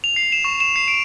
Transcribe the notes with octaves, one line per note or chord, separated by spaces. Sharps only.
F7
C7
E7
C#6
E7
C7
D7